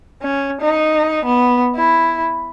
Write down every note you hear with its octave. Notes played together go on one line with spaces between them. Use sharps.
C#4
D#4
B3
E4